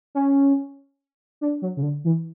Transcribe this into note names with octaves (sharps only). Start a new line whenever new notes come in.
C#4
D4
F#3
C#3
D3
E3